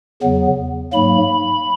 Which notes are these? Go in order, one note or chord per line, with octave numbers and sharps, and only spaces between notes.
E2 C#3 F#3 B3
G#2 F#3 A#3 B5